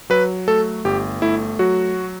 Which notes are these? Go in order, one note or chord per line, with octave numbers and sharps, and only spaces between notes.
F#3 B4
A3 A4
G1 G4
A3 E4
F#3 F#4